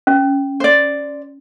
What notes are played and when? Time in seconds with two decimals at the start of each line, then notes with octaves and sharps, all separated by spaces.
0.07 C#4
0.60 C5 D5